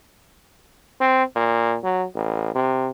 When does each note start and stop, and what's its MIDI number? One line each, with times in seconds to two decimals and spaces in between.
1.01 1.23 60
1.35 1.77 46
1.84 2.04 54
2.15 2.55 33
2.55 2.90 48